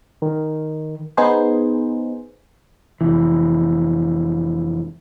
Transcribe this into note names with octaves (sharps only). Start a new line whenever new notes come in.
D#3
B3 D#4 G#4 C5
F1 E3